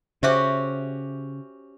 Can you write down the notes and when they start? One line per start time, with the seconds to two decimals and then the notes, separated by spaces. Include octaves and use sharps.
0.23 C#3 C#4 F#4 G4 C5 E5